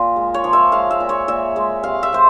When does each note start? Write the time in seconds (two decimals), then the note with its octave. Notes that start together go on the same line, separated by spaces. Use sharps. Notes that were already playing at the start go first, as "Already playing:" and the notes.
Already playing: A#2 F4
0.16 G#3
0.34 C#5
0.44 F3
0.53 E5
0.72 G#3 F5
0.91 E5
1.00 A#2
1.09 C#5
1.28 A#2 E5
1.56 G#3
1.84 C3 F5
2.03 E5
2.13 C3 C5